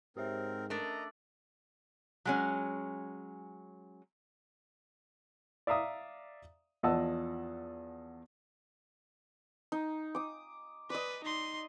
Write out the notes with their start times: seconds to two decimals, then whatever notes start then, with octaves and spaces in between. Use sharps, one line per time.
0.17 G#2 C4 G4 A#4 C#5 E5
0.70 A3 D4 A#4 D5 D#5 A#5
2.25 F#3 G#3 C#4
5.67 D5 E5 F5 A#5 D#6
6.83 E2 F3 D#5 F#5 A5 E6
9.72 D#4
10.15 D6 D#6
10.90 B4 D5 D#5
11.24 D#4 C6